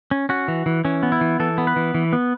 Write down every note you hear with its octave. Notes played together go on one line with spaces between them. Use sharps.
C#4
C#4 F#4
E3
E3
E3 C#4
B3
E4
E3
E3 A4
B3
B4
E3
E3
B3